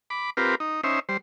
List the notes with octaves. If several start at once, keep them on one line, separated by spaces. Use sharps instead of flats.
B5 D6
C4 F4 G4 A#4 B4
D#4
C#4 D#4 C5 E5
G3 C5